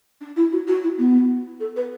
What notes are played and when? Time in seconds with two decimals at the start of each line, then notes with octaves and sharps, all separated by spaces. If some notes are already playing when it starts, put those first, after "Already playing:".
0.20 D4
0.36 E4
0.51 F#4
0.67 F#4
0.82 E4
0.97 B3
1.59 A4
1.76 B4